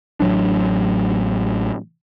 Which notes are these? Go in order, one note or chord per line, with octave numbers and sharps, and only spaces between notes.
A1 D3 F#3 D4